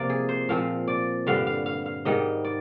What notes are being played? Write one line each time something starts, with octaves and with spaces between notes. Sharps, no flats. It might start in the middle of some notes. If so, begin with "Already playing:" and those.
Already playing: C3 F3 A#3 D5
G#4
C5
A#2 F3 C4 F5
D5
G2 D3 G3 F5
F5
F5
F5
G#2 D#3 G3 D#5
D5